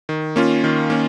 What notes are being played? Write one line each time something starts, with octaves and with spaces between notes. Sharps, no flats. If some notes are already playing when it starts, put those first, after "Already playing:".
D#3
A#3 C#4 F4
D#3
A#3 C#4